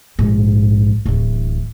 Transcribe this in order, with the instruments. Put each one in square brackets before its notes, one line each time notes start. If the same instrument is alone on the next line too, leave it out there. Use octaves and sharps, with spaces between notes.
[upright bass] A#1 G#2
D1 E3